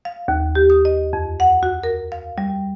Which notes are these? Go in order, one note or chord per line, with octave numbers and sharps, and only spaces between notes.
F5
D#2
G4
D#6
D#5
F2
F#5
F#4
A#4
F5
G3